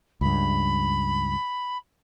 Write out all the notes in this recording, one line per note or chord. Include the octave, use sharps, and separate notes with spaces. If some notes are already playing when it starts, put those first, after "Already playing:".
C#2 G2 B5